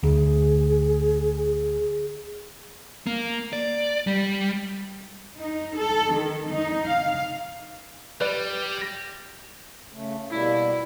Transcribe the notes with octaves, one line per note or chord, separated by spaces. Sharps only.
D2 G#4
A#3
D5
G3
D#4
A4
D#3
D#4
F5
G3 B4 D5
G6 A#6
C#3 A3
B2 G3 A#3 E4